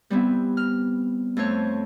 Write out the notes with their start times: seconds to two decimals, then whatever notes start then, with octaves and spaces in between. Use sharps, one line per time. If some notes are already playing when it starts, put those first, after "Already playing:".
0.10 G3 B3 C4 E4
0.57 F6
1.37 F2 A3 C5 C#5